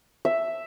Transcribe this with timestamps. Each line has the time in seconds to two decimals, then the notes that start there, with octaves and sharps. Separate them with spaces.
0.25 E5